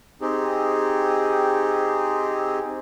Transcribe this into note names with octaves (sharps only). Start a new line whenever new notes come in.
C4 D#4 G4 G#4